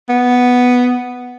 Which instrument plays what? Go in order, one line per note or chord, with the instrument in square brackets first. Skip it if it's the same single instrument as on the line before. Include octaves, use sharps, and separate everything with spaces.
[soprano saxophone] B3